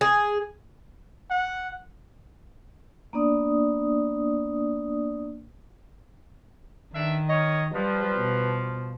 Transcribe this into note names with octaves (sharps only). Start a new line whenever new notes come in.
G#4
F#5
A#3 B3 D4 D5 D#6
G2 D#3 D4 E5
A#4 C#5 D#5
F3 G3 B4
B2